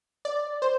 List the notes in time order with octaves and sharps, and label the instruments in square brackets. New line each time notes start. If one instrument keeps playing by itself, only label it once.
[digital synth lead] D5
C5